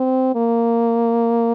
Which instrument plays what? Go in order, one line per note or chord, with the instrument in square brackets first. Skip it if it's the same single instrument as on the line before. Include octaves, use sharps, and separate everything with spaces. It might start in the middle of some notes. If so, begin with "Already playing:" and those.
Already playing: [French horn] C4
A#3